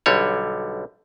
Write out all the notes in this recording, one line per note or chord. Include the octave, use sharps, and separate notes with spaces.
B1 D3 G3 C#5